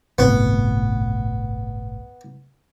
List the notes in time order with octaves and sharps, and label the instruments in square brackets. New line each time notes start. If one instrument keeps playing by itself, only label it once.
[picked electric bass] G1 C2 A2 [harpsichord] B3